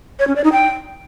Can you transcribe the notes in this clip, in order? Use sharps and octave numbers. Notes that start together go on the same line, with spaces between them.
C#5
C#4
D5
D#4
G5